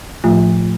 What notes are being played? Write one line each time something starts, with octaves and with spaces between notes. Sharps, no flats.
A2 F3 A3 F4